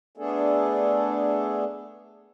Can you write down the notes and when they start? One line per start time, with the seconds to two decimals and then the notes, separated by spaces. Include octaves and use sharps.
0.18 A3 B3 D4 G#4 A4